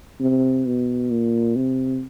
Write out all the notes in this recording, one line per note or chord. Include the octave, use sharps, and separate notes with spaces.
C3
B2
A#2
C3